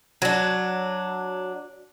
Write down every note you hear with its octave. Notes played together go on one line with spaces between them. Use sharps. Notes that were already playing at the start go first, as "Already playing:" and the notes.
F#3 D4